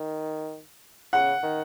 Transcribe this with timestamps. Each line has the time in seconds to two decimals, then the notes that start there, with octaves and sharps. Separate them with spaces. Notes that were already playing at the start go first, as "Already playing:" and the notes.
Already playing: D#3
1.13 C#3 F#5
1.43 D#3